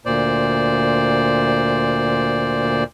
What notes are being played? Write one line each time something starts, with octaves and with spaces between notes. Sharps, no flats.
D2 A#2 C5 D5